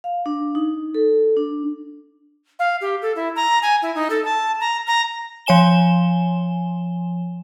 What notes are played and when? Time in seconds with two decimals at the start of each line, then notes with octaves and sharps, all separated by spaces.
0.04 F5
0.26 D4
0.55 D#4
0.95 A4
1.37 D4
2.59 F5
2.81 G4
3.02 A4
3.16 E4
3.36 A#5
3.62 G#5
3.82 E4
3.95 D#4
4.10 A4
4.25 A5
4.60 A#5
4.87 A#5
5.46 F3 C#5 G#5 E7 G7